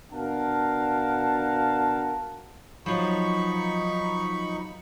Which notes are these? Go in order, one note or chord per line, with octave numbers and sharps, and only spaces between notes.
B2 D4 A#4 F5 F#5 A5
F3 F#3 D#4 B5 C#6